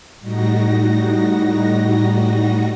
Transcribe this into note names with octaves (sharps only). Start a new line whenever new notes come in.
A2 G3 D#4 F#4 A#6